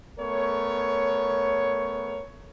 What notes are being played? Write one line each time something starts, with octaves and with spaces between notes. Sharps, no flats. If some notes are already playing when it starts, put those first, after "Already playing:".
A3 B3 A#4 C#5